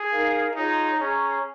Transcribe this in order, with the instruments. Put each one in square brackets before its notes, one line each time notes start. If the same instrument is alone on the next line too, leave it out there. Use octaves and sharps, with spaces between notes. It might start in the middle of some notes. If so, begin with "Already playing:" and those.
Already playing: [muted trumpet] G#4
[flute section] D#4 A#4 F5
[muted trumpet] D#4 [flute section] F4 G#4 C#5 A#5
[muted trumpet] C#4 [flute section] G#4 C#5 A#5 C#6